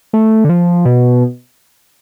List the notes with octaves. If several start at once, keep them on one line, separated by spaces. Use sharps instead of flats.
A3
D3
F3
B2